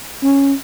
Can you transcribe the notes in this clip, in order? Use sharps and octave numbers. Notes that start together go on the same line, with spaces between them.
C#4